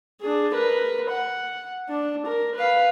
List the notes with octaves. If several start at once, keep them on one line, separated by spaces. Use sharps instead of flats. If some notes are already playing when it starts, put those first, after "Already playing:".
D4 G#4
A#4 B4
F#5
D4
A#4
B4 F5